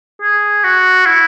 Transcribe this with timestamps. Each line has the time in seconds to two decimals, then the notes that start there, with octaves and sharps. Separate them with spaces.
0.22 G#4
0.64 F#4
1.06 E4